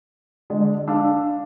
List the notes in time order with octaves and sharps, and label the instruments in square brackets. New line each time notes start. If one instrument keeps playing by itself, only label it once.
[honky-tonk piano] D3 G#3 D5
[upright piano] D4 F5 [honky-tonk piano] E6